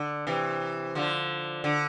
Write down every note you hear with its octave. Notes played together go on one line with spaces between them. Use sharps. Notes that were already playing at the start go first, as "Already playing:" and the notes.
Already playing: D3
C3 E3
D3 F3
D3